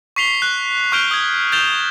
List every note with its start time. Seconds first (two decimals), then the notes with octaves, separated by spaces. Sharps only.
0.16 C#6 B6 C7 F7 G7
0.42 F#6
0.92 C#6 F6 G6 D7 F7 G7
1.11 D#6 G#6
1.52 G6 A6 E7 F7 G7